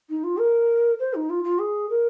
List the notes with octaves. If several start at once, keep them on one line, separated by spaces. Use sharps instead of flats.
D#4
F4
A#4
C5
D#4
F4
F4
G#4
A#4